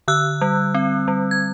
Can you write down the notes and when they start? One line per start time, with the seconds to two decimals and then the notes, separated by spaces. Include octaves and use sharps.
0.08 D3 E6 F#6
0.41 G3
0.74 C4
1.08 G3
1.31 G#6